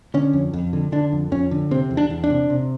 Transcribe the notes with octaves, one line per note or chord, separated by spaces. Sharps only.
D3 C#4
F2
F2
D3
D3 D4
F2
F2 C#4
D3
C3 C4
E2
D4
E2
D4
C3
C3